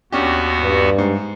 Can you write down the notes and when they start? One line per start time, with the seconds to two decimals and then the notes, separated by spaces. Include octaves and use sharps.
0.12 D#2 B3 C#4 D4 F#4 G4
0.62 G2
0.98 G#2